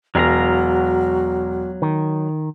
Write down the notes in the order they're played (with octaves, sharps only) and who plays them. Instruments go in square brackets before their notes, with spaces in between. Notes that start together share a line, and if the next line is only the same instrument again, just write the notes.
[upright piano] E1 [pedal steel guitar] F#3 F5 A#5 [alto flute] F#4
[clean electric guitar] D#3